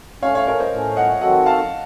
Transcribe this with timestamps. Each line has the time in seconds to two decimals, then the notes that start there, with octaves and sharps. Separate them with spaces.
0.23 A2 A3 C#4 C#5 F5
0.35 C#5 F5
0.47 A#4 C#5
0.60 C5 D#5
0.72 A2 A3 C#4
0.96 D#5 F#5
1.21 D#3 F#3 C4 F#4 A4 D#5 F#5
1.46 F5 A5